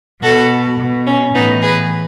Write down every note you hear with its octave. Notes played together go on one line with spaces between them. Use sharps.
B2 F#4 A4
B2
C#4
A2 E3 B3 D#4
G#4 B4